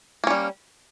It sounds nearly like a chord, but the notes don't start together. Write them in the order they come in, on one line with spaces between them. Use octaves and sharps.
A#3 C#4 G3